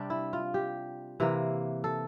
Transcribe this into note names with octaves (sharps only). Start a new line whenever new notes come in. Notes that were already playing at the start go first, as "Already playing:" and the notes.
Already playing: C3 G3 D4
E4
F4
G4
C3 E3 A#3
A4